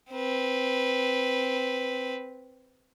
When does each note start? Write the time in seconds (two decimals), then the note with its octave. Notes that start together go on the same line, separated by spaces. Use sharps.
0.11 C4 B4